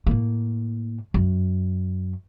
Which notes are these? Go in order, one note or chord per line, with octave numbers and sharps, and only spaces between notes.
A2 A#3
F#2